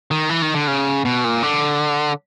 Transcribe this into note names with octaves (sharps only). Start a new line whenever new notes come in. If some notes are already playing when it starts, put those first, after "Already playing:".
D#3
E3
D#3
D3
C#3
B2
A#2
D3